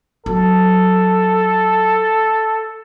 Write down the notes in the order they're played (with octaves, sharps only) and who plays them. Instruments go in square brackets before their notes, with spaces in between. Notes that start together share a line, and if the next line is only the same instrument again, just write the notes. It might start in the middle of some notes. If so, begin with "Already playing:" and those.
[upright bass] F#3 [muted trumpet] A4